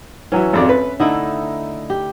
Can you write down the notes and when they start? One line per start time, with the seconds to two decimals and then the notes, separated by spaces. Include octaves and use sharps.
0.32 E3 F#3 C#4 E5
0.53 G#1 F2 D5
0.69 B4
1.00 D3 A3 D#4 E4
1.90 G4